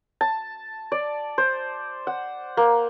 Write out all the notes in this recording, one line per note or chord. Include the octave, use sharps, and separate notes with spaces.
A5
D5
C5
F#5
A#3